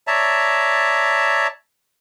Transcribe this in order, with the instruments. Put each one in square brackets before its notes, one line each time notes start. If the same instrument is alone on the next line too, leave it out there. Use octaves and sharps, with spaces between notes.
[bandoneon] C#5 D5 E5 A5 A#5